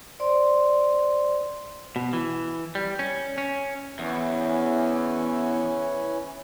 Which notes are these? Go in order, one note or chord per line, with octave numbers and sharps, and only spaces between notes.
C5 D5 C6
B2
E3
G3
C#4
C#4
E2 E3 C#4